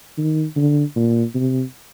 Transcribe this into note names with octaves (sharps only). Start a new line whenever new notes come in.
D#3
D3
A#2
C3